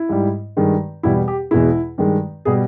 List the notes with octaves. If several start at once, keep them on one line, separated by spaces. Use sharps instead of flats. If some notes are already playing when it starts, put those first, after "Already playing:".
Already playing: E4
G#2 G3
G2 D#3 G#3
E2 B2 G3 E4
G4
E2 B2 G#3 E4
G2 D#3 G#3
B2 G3 G#4